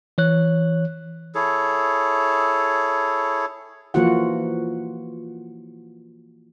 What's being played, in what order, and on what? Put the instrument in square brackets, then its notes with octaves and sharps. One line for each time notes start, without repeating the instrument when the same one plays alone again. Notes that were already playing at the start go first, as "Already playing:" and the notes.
[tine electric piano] E3 C#5 F#6
[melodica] E4 G#4 A4 C#5
[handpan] E3 F3 A#3 F4 F#4 F#5